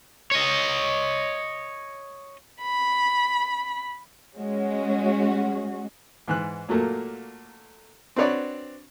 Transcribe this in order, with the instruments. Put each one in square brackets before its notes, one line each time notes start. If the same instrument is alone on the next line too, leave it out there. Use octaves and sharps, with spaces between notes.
[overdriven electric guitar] C#5 D#5
[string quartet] B5
[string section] G#3 C#4 F#4
[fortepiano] G#2 E3 F#6
A#2 F#3 A3 A#3
C4 D4 F#4 B4 C#5 D5